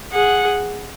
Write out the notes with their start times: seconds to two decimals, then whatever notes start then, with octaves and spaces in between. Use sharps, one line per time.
0.12 G#4 F#5